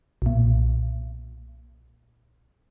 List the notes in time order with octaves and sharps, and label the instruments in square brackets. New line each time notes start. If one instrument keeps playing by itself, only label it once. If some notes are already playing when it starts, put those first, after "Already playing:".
[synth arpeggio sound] B1 A#2